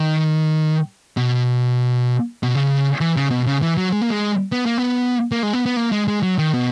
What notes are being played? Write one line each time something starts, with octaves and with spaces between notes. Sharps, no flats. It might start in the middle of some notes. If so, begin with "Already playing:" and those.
Already playing: D#3
B2
B2
C#3
E3
C#3
B2
C#3
E3
F#3
G#3
A#3
G#3
B3
A#3
B3
A#3
G#3
B3
B3
A#3
G#3
G#3
F#3
D#3
B2